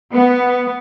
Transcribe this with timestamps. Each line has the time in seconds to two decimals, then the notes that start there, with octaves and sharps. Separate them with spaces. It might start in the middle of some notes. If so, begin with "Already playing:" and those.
0.12 B3